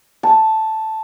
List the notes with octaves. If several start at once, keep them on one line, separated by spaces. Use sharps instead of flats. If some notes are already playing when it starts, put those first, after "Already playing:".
A5